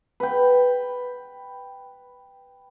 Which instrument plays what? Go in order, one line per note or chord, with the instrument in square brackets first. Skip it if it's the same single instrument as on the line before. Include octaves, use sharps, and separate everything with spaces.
[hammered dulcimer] B4 G5